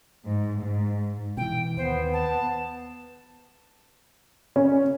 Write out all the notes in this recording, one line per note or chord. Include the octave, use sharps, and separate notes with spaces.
G#2
G#2
B2 E3 G5
D#2 B3 C5
A5
C#4